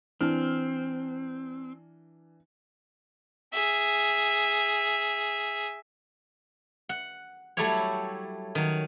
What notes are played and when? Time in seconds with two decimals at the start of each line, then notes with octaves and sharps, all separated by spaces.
0.21 E3 C4 D4 F6
3.53 G#4 E5
6.89 F#5
7.57 F#3 G3 A3 E4 G4 C#5
8.55 D#3 F#3